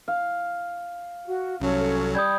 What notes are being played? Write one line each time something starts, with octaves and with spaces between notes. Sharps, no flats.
F5
F#4
C2 F#3 C#4 A4
G3 D#6 G6 G#6